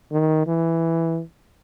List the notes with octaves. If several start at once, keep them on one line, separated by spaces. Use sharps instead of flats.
D#3
E3